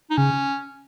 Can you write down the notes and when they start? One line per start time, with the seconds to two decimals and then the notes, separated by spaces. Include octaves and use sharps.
0.10 D#4
0.17 C#3 C#4